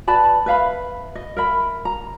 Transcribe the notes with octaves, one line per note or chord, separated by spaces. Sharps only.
B4 D5 A5 B5
B4 E5 F5 B5
D#5
A#4 E5 B5
A#5